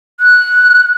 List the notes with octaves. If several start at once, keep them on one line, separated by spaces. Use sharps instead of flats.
F#6